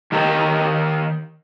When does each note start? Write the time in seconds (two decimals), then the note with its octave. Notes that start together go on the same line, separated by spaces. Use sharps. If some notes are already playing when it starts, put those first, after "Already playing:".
0.12 D#3 G4 A#4